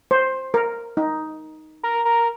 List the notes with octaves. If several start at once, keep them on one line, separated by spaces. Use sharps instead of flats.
C5
A#4
D#4
A#4
A#4